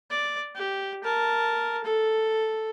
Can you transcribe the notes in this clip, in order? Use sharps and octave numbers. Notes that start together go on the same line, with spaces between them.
D5
G4
A#4 A5
A4